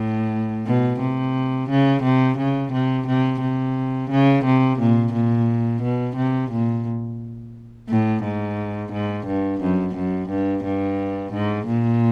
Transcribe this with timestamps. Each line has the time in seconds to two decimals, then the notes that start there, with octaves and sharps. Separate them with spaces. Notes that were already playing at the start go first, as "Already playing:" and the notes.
Already playing: A2
0.66 B2
1.00 C3
1.70 C#3
2.03 C3
2.38 C#3
2.73 C3
3.07 C3
3.41 C3
4.10 C#3
4.45 C3
4.79 A#2
5.13 A#2
5.83 B2
6.16 C3
6.51 A#2
7.89 A2
8.24 G#2
8.92 G#2
9.27 G2
9.61 F#2
9.95 F#2
10.30 G2
10.64 G2
11.33 G#2
11.67 A#2